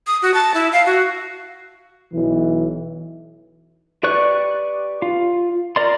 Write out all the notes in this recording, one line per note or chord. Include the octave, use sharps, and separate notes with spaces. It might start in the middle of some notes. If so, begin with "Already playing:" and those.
D#6
F#4
A5
E4
F5
F#4
B1 E3
G4 B4 D5 C#6 F#6
F4
A#4 D5 C6